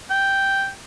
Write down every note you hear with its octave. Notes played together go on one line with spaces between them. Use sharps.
G5